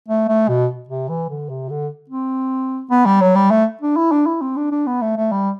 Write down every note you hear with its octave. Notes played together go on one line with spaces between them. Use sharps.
A3
A3
B2
C3
E3
D3
C3
D3
C4
B3
G3
F#3
G3
A3
D4
E4
D4
E4
C4
D4
D4
B3
A3
A3
G3